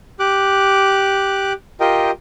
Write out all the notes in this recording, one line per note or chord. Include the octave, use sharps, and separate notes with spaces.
G4 D6 F#6
F4 G4 A#4 D#5 G5